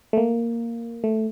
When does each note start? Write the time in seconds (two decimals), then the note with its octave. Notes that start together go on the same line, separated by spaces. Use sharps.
0.13 A3
0.17 A#3
1.04 A3